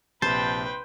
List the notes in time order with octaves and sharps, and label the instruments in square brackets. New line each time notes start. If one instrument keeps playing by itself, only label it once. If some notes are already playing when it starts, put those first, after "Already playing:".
[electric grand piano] A#1 C3 [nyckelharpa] B4 G5 [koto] C5 [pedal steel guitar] A5